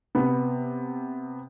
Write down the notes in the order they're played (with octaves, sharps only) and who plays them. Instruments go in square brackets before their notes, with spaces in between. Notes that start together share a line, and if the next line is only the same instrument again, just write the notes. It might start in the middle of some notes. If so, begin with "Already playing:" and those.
[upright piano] C3 B3